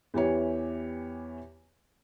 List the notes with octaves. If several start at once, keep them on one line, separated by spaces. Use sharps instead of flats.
E2 E3 G4 C#5